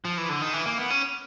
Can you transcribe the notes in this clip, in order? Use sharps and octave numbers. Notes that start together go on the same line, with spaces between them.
F3
E3
D3
D#3
E3
A#3
B3
C#4